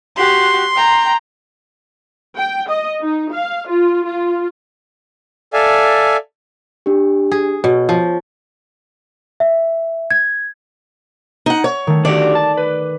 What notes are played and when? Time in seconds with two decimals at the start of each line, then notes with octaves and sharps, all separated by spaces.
0.17 F#4 G4 C6
0.76 G5 A#5
2.36 G5
2.69 D#5
3.01 D#4
3.32 F5
3.68 F4
4.05 F4
5.53 A4 D5 E5 F5 G#5
6.86 D4 G4
7.32 G#4
7.64 B2 C#5
7.89 F3 C#5
9.40 E5
10.11 G#6
11.46 D#4 F#5
11.64 C#5
11.87 D#3 A3
12.05 D4 F#4 G4 D5
12.35 A5
12.57 B4